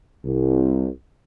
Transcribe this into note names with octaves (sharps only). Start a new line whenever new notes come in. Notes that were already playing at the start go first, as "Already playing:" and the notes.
C2